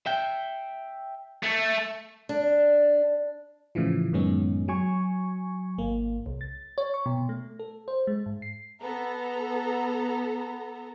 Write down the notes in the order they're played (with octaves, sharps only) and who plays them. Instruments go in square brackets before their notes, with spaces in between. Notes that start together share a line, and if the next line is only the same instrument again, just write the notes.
[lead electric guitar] E5 G5
[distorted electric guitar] A3
[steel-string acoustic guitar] D4
[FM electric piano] A2 C#3 E3 F3
F#2 A2 D#3 G#3 B3 C#4
F#3 G#5 C#6
G#1 A#3
C2
A6
C#5
C#6
B2
A3
A4
C5
G#3
G#2
C7
[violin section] B3 A4 A#5